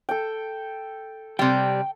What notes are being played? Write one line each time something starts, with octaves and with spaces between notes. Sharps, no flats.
A4 G5
C3 G3 G5